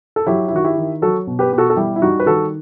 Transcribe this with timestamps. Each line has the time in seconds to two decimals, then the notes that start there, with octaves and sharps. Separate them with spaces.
0.16 A4
0.27 F#3 E4 G4
0.48 E4
0.53 D#3 F#4
0.64 E4 G4
0.77 D#3
1.02 F#3 F#4 A4
1.27 B2
1.39 G4 B4
1.52 B2 G4
1.58 F#4 A4
1.70 A4
1.76 G3 E4 G4
1.96 E4
2.02 G3 D#4 F#4
2.20 B4
2.26 D#3 F#4 A4